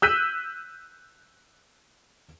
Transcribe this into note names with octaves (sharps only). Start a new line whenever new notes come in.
E6 F#6 G6 B6 D#7 E7